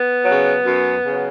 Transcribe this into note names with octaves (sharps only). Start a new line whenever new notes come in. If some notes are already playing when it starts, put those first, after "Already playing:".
Already playing: B3
C#3 F#3
F#2
C#3 F#3